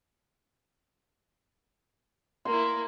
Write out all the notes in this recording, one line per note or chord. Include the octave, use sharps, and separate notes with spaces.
A#3 E4 C6